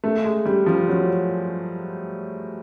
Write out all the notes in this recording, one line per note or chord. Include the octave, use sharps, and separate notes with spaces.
A3
G#3
G3
F3
F#3